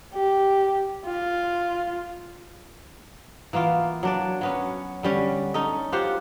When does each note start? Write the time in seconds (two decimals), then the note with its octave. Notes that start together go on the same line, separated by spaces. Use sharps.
0.14 G4
1.06 F4
3.53 E3 A#3 B3 F4
4.03 F#3 D4 D5
4.41 F#3 B3 C#4
5.03 D3 G3 C#4
5.54 C#4 D#4 A4 D#5
5.92 F4 G4 C5 F#5